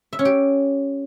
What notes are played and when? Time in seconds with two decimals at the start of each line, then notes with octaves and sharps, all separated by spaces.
0.13 E5
0.19 C#4
0.25 G4